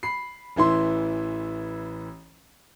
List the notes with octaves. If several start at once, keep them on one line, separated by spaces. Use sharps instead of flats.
B5 C7
A1 E3 E4 C6